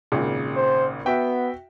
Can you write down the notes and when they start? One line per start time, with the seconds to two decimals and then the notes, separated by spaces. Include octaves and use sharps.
0.12 G#1 A#2 C#3
0.56 C5
1.06 B3 F#4 E5 G5